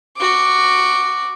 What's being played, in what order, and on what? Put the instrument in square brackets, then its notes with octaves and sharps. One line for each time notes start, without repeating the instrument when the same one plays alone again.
[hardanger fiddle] F#4 D6